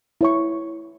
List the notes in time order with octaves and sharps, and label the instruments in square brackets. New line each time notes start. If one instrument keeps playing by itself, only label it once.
[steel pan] E4 C#5 C#6